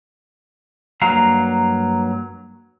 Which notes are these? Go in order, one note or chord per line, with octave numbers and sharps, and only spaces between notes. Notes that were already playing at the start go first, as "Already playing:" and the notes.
G2 F#3 A#3 F5 A#5